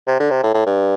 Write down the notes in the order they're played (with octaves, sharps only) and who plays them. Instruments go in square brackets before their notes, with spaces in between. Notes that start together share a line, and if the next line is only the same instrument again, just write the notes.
[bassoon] C3
D3
C3
A2
A2
G2